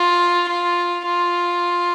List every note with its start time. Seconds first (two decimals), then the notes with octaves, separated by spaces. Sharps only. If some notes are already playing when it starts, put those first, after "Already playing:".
Already playing: F4
0.48 F4
1.06 F4